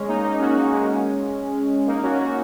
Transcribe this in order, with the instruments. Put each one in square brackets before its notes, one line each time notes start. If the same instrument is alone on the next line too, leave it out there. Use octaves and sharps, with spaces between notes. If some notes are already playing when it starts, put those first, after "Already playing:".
Already playing: [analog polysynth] G#3 C#4
A#3 D#4
A#3 D#4
C#4 F#4
A#3 D#4
G#3 C#4
A#3 D#4
C#4 F#4
C#4 F#4